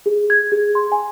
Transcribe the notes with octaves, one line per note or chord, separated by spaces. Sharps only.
G#4
G#6
G#4
C6
G#5